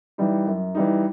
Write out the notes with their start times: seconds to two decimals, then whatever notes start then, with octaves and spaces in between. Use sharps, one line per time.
0.18 E3 G3 D#4
0.46 F#2
0.75 E3 G3 D#4